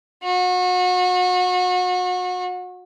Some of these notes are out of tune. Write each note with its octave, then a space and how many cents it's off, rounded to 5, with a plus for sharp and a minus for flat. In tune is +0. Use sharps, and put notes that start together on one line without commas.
F#4 -30